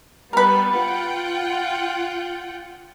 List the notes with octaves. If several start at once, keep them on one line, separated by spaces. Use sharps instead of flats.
G3 B3 A#4 B4
F4 F#5 G5